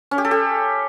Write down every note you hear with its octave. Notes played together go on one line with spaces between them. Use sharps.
C#4
G4
A4
G4